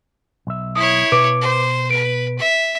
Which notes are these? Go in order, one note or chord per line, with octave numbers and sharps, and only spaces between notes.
B1 E5
E4 C#5 D#6
B2 B4 D6 D7
C5
B4 D7
E5